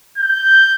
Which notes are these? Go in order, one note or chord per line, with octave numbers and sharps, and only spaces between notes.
G6